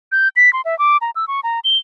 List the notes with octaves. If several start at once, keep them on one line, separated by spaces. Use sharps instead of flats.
G6
B6
C6
E5
D6
A#5
E6
C#6
A#5
G7